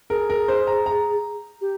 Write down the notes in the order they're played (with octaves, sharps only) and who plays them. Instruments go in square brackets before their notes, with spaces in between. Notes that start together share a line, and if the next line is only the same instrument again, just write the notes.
[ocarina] G#4 [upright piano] A#4
[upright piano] A#4
C5
A#5
A#5
[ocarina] G4